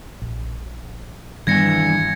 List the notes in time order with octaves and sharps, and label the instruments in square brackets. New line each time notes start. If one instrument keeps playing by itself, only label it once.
[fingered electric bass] A#1
[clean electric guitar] G2 E3 [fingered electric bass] D#3 G3 B3 [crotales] G#6 A#6 C#7